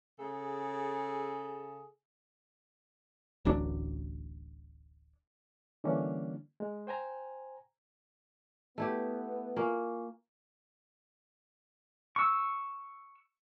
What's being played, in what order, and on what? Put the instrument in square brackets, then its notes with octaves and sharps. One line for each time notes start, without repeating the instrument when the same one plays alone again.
[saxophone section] C#3 G#4 A4
[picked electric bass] D1 A1 F#3 D4
[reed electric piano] D3 E3 G3 A#3 C#4 D4
G#3
C5 G5 G#5 A#5
[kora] A3 E4 G4 [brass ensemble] B3
[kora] A#3 [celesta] F4 G#5 C#6
[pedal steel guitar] C#6 E6